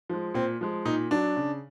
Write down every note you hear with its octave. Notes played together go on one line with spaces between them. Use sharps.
F3 G#3
A#2 C4
F3 G#3
A#2 D#4
F#3 D4
C#3